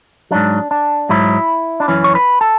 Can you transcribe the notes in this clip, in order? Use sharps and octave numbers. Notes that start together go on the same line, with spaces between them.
G#2 F#3 D4
D4
G#2 F#3 E4
D4
F#2 E3 C#4
C#5
B4
A4